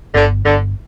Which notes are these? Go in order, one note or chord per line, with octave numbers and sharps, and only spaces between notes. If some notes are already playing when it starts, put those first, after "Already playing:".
G1 D3
G1 D3